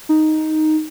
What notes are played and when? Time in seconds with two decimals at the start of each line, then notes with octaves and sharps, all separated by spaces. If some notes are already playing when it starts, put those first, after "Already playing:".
0.09 D#4